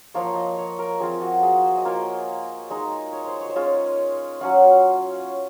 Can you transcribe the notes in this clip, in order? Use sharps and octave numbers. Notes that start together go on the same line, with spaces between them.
F3 A#3 F4 C#5
D#5
C#5
A#4
F3 C4 F4 G#4
F#4
G#4
C5
D#5
A#3 F4 C#5
G#3 D#4
C#5
C5
C#5
C5
G#3 C#4 F4 C#5
F#3 C#4 F4 F#5